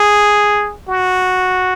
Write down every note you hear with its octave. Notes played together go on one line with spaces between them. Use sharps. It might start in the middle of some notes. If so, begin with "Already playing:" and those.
Already playing: G#4
F#4